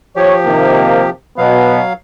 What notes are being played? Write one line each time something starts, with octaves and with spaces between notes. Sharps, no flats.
F3 G4 C#5
C3 D#3 A#3
B2 F#3 B3 F5